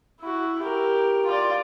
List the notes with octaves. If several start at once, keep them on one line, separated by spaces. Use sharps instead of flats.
E4 F#4
G4 A#4
F4 D5